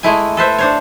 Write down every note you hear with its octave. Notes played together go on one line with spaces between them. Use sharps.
G#3 A3 E4 G#5
A4 B4 C5 E5
D4 C5 C#5